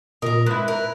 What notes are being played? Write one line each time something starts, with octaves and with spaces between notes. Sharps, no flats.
A#2 A#4 D#5 A#5
G#2 E4 B4 F#6
A#4